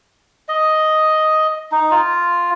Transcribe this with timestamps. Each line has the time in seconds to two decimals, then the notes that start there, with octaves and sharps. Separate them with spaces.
0.49 D#5
1.72 D#4
1.92 F4